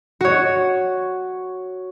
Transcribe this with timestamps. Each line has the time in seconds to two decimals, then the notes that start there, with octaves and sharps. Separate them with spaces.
0.21 F#4 C#5